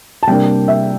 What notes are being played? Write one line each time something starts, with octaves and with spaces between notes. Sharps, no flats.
A5
C3 G3 A#3 D4 G5
E5